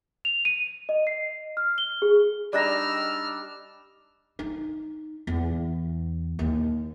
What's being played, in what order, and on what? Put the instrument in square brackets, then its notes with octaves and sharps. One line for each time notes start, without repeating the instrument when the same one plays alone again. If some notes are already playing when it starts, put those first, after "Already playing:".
[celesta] F7
D#7
D#5
C7
F6
G7
G#4
[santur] G3 D4 D#4 [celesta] D5 D#5 A#6 [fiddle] E6 F6
[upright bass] D#4
E2
D#2